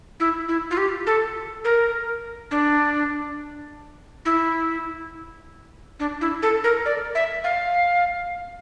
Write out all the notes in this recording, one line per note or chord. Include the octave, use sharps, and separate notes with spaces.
E4
E4
F4
G4
A4
A#4
D4
E4
D4
E4
A4
A#4
D5
E5
F5